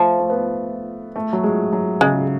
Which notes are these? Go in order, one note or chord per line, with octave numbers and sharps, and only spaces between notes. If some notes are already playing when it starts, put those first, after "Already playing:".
Already playing: F3 A3
A3
B3
A3
F#3
G#3
F#3
C#3 G#3